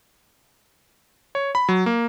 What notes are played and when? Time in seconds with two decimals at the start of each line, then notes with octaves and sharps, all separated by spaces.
1.35 C#5
1.55 B5
1.69 F#3
1.86 A#3